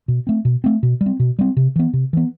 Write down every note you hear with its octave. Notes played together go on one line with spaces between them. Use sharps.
B2
A3 C4
B2
A3 C4
B2
G3
C4
B2
G3 C4
C3
E3 B3
C3
E3 B3